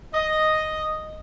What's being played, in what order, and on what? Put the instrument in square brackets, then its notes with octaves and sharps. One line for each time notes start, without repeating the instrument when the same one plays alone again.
[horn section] D#5